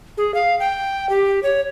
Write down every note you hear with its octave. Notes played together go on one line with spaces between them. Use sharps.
G#4
F5
G5
G4
C#5